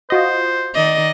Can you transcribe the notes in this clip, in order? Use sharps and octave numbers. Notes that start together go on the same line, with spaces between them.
F4 F#4 C5 D#5
D#3 D5 D#5